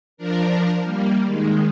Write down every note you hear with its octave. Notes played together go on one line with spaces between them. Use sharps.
F3 D4 A#4
G3 A#3
D#3 G#3